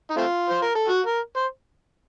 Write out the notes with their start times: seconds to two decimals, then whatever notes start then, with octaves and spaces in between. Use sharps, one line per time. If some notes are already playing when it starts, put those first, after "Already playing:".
0.10 D#4
0.17 A3 C4 F4
0.49 C5
0.63 A#4
0.75 A4
0.88 F#4
1.07 A#4
1.37 C5